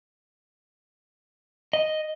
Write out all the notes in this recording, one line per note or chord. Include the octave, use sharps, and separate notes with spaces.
D#5